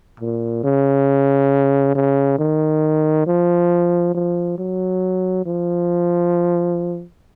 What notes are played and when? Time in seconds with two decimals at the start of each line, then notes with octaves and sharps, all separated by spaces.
0.20 A#2
0.64 C#3
1.95 C#3
2.39 D#3
3.27 F3
4.14 F3
4.58 F#3
5.46 F3